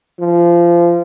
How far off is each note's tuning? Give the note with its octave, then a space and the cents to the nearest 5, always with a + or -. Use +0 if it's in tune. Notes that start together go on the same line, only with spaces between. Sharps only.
F3 -25